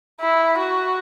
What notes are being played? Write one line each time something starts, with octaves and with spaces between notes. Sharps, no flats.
E4
F#4